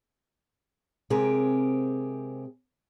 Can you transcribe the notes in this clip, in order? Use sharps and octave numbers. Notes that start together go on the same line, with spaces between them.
C3 G#3 C4 G4 G#4 A#4